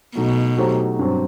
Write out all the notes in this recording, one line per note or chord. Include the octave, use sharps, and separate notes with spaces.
B2 F#3 A3 D#4
F#3 A3 D#4 G4 C5
G2 F#3 C4